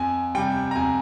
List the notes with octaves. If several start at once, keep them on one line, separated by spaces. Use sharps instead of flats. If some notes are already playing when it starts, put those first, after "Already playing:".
Already playing: F2 G#5
C3 G3 G5
A#5
F2 G#5